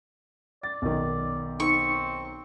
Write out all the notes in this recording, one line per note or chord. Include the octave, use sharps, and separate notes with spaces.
D5 A6
B1 D#3
C4 D#4 C#6